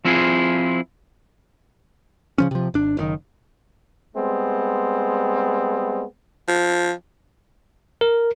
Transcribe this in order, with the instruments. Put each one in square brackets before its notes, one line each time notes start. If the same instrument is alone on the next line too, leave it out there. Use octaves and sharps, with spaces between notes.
[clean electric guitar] F3 C4 E4 F4 G#4
[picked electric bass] C#3 F3 C#4
C3 F3
G#1 D4
F#1 A2 D#3
[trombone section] G3 G#3 B3 C4
[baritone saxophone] F3
[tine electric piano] A#4